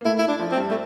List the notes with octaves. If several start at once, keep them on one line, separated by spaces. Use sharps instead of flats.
A#3
A2 A3 E4
E4
D4
F3
C4
G2 G3
A3